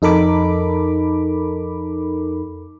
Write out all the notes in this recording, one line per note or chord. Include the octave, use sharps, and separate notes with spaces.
F2 D#4 A4 A#4 B5 D6